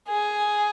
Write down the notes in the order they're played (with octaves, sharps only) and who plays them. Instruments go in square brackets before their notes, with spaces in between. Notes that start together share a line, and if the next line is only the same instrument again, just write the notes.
[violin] G#4